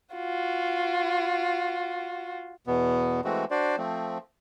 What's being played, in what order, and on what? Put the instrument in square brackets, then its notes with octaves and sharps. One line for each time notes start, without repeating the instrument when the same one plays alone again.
[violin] F4 F#4
[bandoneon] E2 B2 B3
E3 G#3 A3 C4 F#4
D4 F#4 C5 D5
F3 A3 C4